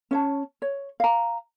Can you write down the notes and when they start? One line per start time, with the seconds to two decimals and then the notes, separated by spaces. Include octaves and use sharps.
0.11 C#4 C#5 A5
0.62 C#5
1.00 F5 A#5